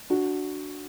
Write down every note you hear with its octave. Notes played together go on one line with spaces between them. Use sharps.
D4 F#4